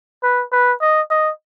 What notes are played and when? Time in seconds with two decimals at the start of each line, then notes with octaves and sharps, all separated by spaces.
0.23 B4
0.52 B4
0.81 D#5
1.10 D#5